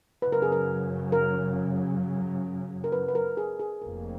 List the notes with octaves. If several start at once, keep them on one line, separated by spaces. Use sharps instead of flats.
F#2 C#3 F#3 B4
A#4
G#4
A#4
A#4
A#4
B4
B4
A#4
G#4
G#4
F1 F2 F3 A#3 A#4